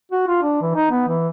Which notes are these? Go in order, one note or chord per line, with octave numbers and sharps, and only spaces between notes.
F#4
F4
D4
E3
D#4
B3
E3